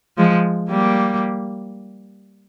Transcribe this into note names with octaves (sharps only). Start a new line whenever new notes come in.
F3 G#3
G3 A#3